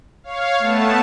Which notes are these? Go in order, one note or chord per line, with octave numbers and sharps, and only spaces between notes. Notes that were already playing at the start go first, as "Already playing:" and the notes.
C#5 F5
A3 B3 A5